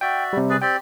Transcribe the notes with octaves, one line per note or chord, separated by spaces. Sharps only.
F#4 D5 E5 G5
C3 G3
G#4 B4 D5
C4 G4 D5 G5